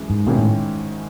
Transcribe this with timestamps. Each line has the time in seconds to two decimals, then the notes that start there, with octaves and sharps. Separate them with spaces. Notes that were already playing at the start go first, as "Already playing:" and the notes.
Already playing: F#2 E3 G#3
0.10 G#2
0.27 G#2 B2 D#3 G#3 C#4 E4
0.38 A2